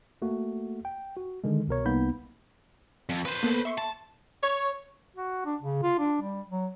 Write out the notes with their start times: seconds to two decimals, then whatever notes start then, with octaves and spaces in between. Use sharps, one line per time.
0.22 A3 A#3 F#4
0.85 G5
1.17 F#4
1.44 D3 D#3 G#3
1.68 C2 B2 A#4 C#5
1.85 C2 A#3 B3 D#4 B5 G6
3.09 F2
3.26 B4 C5
3.43 A#3 B3 A4
3.65 E5 C6 C#6
3.78 A5
4.43 C#5
5.17 F#4
5.45 D4
5.62 C#3
5.83 F4
5.99 D4
6.22 G3
6.50 F#3